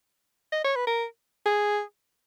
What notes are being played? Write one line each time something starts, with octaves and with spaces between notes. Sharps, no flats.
D#5
C#5
B4
A#4
G#4